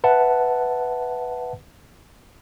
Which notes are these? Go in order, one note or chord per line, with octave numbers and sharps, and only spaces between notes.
B4 E5 F#5 A5